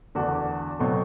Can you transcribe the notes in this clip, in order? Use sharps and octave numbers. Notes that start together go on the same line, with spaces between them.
E2 D3 A3 D4 F#4
B2 F#3 A3 C4